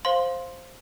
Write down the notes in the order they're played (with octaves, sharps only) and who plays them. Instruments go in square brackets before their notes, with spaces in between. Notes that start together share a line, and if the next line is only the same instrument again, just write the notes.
[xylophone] C5 F5 C6